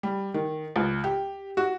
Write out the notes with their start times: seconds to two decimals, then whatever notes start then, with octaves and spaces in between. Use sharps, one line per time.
0.03 G3
0.34 D#3
0.76 C#2
1.04 G4
1.57 F#4